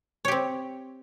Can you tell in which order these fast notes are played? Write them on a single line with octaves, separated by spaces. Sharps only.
C#5 G4 C4